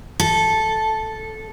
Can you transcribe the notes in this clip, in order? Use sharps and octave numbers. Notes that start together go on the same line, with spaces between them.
A4